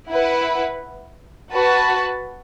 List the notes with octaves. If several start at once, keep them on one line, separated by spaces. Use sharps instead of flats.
E4 B4 F#5
F#4 B4 F#5 A5